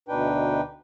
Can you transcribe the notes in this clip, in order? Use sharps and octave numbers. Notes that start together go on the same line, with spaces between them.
D2 B2 D4 D#4 B4 G5